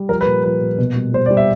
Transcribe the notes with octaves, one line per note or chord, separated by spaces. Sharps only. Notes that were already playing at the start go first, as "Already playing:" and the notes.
Already playing: G3
F3 A#4
B4
A#2
F3 B4
A#2
B2
G3
G3 C5
D5
G3
E5